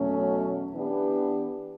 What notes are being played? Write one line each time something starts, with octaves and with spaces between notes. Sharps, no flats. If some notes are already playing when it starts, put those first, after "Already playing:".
Already playing: E2 B2 F#3 A3 C#4
E3 B3 D4 G4